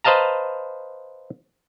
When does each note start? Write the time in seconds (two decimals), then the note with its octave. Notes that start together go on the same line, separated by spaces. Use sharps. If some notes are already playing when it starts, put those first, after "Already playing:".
0.04 B4 C5 D#5 F5 A5 A#5